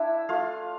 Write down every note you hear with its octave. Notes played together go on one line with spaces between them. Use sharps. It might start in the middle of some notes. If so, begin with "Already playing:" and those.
Already playing: A3 D4 E4 E5
A3 F4 F5